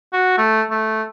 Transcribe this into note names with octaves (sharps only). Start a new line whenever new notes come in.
F#4
A3
A3